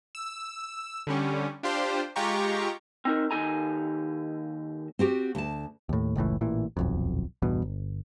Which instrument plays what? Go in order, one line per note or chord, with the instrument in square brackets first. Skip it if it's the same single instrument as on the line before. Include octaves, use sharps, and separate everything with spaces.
[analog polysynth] E6
D3 G3 C#4
D4 F4 G4 C5
G#3 F4 G4 A#5 C#6
[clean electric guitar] C4 D#4 A#4
D#2 B3 D#4 A4 G#5 A#5
[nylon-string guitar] C4 F#4 G4
D2 A5
[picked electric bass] D#2 A2
F#1 C#2 A2 E3
A1 A#2 E3
D#1 B1 F2
A1 E2 G2 B2
G1